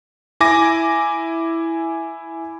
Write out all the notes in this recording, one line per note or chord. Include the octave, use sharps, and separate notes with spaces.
E4 G#5 D6 A#6